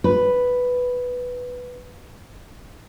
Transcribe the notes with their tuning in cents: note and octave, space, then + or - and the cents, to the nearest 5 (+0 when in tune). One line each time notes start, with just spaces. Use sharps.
B4 +0